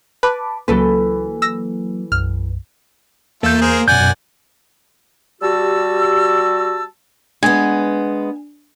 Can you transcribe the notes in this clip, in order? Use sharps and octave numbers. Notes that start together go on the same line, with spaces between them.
B4 A5 B5 D6
C#2 E3 F#3 A#3 A4 B4
E6 A#6
B1 F#2 F6
E2 A3 A#3 F4 A4 G6
G#4 A#4 C5
F#2 B2 D5 F#5 G#5 G6
F#2
G3 F#4 G4 A5 E6
G#3 B3 D4 G#5